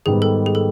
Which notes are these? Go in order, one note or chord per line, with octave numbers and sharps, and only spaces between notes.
G#2 D#3 G3 B3 D#4 G#4
A4
G#4
A4